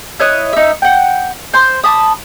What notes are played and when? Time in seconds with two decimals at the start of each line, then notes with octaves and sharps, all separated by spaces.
0.20 E4 C#5 D#5 F#6
0.53 D#4 E5
0.82 F#5 G5
1.53 C5 C6
1.84 A5 B5 D#6